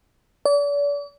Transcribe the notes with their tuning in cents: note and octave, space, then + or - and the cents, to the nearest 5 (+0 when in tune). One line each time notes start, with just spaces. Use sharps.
D5 -40